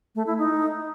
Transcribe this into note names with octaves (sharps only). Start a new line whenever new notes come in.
A3
E4
D#4